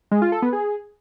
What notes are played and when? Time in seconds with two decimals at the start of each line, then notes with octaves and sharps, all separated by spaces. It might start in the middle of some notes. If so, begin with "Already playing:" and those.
0.11 G#3
0.22 F4
0.32 A4
0.42 B3
0.53 G#4